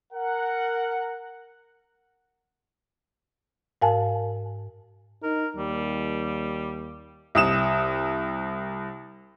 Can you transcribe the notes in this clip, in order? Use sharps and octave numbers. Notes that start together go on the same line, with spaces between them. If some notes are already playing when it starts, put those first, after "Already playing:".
A#4 F#5
G#2 A#4 F5 G#5 A5
D#4 A#4
D#2 G3
C2 D#6 E7